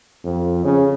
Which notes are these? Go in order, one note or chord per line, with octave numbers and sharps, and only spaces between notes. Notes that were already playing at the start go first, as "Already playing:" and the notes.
F2
C#3